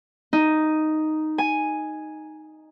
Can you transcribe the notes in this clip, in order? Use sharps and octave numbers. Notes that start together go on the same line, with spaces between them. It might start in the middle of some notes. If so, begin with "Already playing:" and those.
D#4
G#5